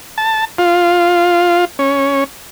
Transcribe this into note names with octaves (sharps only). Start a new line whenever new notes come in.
A5
F4
C#4